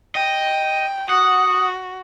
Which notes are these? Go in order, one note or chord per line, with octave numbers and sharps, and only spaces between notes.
D#5 G5
F#4 F#5 D#6